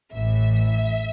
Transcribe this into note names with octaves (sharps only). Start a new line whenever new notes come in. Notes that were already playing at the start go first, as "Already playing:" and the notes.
A1 A2 E3 E5
E5